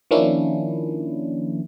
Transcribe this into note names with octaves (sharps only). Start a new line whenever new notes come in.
D#3 F3 A#3 C#4 D4 E4